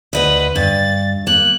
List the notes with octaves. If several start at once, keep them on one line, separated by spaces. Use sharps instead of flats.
D2 B4 D#5 F#5
G2 A6
A#3 F#6